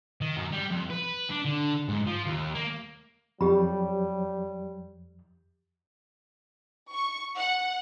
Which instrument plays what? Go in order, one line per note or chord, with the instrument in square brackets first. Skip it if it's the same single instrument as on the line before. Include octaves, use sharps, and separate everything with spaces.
[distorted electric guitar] D#3
F#2
G3
F2
B4
D4
D3
G#2
F3
D#2
A#3
[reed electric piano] F2 [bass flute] F#3 [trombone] G3 [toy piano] G4 B5
[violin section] C#6
F#5